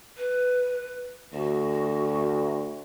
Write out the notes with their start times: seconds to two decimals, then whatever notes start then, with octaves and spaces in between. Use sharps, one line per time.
0.17 B4
1.34 D2 F#4